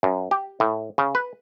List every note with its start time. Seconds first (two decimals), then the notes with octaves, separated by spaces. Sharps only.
0.03 F#2
0.31 G4
0.60 A2
0.98 C#3
1.15 B4